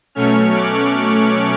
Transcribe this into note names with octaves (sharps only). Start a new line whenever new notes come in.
B2 F#3 A3 C#4 C#6 F6
D6 F#6